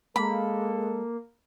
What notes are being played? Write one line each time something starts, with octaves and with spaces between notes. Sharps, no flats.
G#3 A#3 A4 B5